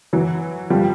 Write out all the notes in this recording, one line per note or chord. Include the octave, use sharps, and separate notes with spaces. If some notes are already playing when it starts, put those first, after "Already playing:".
E3 F#3
F3 G3